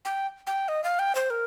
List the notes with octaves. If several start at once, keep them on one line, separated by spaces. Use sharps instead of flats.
G5
G5
D#5
F5
G5
C5
A#4